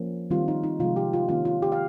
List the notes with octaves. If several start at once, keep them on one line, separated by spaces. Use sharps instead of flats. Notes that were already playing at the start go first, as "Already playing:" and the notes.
Already playing: F3 A#3 C#4
D#3 G3 C4 F4
D#4
D#4
C3 F3 G#3 F4
G4
F4
D#3 A#3 C#4 F4
F4
G4
F5